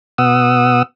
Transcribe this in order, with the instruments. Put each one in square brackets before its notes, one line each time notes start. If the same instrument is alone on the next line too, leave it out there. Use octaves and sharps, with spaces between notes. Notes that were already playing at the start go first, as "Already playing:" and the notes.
[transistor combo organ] B2 F#5 D#6 E6